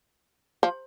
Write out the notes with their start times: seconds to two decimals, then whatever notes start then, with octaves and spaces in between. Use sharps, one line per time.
0.63 F3